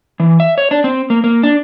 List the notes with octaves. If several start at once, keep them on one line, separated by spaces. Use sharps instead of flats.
E3
E5
C#5
D4
C4
A#3
A#3
D4